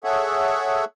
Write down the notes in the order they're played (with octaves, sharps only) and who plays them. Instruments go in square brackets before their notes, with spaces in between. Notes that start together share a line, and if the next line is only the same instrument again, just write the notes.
[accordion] G#4 A4 C#5 E5 F#5